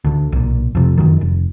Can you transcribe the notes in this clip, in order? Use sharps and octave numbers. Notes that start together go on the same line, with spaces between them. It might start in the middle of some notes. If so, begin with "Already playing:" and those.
D2 D3
B1 A#2
F2 C3
F1 A#1 F#2 D#3
F1